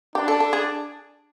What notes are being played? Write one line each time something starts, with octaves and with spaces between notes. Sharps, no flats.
D4 G4
A4
A4
G#4